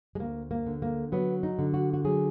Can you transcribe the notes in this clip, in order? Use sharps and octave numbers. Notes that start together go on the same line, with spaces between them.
G#3
D2 A#3
A#3
D3
A#3
F#3 B3
D#4
D3
F#4
F#4
F#3 G#4